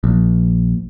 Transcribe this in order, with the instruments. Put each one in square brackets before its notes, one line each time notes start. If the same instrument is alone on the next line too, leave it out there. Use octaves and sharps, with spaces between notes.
[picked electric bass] A#1